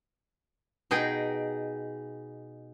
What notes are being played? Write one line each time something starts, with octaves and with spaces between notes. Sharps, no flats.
B2 D#4 G#4 G5